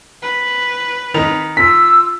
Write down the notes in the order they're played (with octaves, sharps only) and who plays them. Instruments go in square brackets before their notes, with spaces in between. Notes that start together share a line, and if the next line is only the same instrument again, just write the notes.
[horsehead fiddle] B4
[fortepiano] D#3 [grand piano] F7
[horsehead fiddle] F4 [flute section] E6 [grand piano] B6